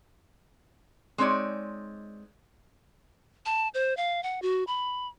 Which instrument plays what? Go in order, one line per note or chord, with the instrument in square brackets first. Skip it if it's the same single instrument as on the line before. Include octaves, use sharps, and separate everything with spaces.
[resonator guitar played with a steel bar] G#3 C4 D#4 C#5 D5
[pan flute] A5
C5
F5
F#5
F#4
B5